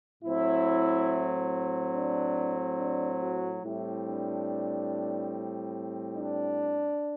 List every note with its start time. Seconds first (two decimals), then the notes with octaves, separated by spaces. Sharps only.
0.23 A2 F#3 C4 E4
1.94 D4
2.78 D4
3.20 F#4
3.63 A2 G3 C4 E4
4.05 D4
6.17 D4